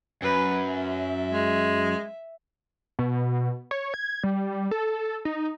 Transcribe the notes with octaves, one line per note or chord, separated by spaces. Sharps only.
F#2 B4
E5
G#3
B2
C#5
G#6
G3
A4
D#4